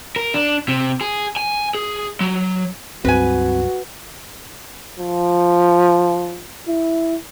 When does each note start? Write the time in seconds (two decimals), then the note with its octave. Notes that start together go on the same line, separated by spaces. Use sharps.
0.16 A#4
0.34 D4
0.69 C3
1.01 G#4
1.36 G#5
1.75 G#4
2.21 F#3
3.05 C#2 G2 F#3 C4 F#4 B4 G#5
4.99 F3
6.68 E4